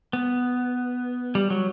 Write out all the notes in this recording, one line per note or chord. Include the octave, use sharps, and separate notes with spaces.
B3
G3
F#3